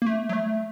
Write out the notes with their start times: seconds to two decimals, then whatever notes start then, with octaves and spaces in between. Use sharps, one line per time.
0.02 A#3
0.06 A3
0.29 F#3
0.33 A3